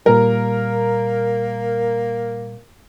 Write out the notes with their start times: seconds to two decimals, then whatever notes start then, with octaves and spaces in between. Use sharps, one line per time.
0.06 A#2 G3 A#3 A#4